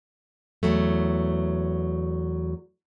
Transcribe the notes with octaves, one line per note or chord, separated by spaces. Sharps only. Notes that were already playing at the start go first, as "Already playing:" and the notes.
E2 F#3 A3